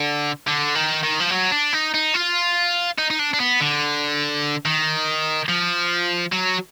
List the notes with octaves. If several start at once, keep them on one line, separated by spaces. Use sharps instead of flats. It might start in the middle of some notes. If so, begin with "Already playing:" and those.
Already playing: D3
D3
D#3
D#3
F3
F#3
D4
D#4
D#4
F4
D#4
D#4
D4
D4
B3
D3
D#3
F3
F#3